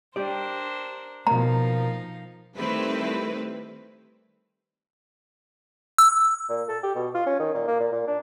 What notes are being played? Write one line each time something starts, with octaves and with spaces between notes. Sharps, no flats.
D4 G4 A#4 C5 D5
B2 F3 A#3 D#4 F5 A#5
D#3 G3 A3 C4 E4 B4
E6
A#2
A4
G4
B2
F4
C#4
D#3
A#2
A#3
A#2
A#2
D4